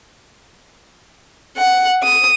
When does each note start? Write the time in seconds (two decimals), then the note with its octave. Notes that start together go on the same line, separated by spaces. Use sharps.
1.57 F#5
2.03 D#6